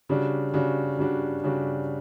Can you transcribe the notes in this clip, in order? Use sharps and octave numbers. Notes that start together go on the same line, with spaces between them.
C#3 G3 D4 F#4
C#3 G3 D4 F#4
C#3 G3 D4 F#4
C#3 G3 D4 F#4